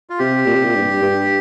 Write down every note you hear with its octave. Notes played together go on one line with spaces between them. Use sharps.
F4
C3 G4
A#2
C3
A#2
G2
G2